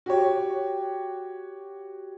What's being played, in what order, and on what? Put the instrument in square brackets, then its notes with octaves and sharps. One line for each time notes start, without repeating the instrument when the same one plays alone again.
[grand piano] F#4 G4 C#5